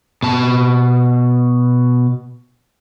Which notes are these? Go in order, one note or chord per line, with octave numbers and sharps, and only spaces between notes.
B2 A5